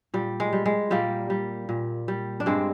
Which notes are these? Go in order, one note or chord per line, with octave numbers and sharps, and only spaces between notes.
A#2 G3
G#3
G3
G#3
A#2 G3 A#3
G3
A#2
G3
D4
G2 G#3 C4